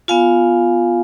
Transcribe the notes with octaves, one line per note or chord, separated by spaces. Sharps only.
B3 F4 F5 G#5